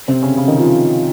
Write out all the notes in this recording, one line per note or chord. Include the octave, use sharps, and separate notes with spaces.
C3 C4
C#3 C#4
C#3 C#4
D#3 D#4
F3 F4